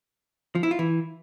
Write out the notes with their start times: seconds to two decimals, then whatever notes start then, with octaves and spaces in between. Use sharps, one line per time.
0.55 F3
0.63 E4
0.71 F4
0.79 E3